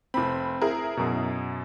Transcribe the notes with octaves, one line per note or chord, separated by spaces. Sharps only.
F1 C4 B5
E4 G#4 A#4
F#2 B2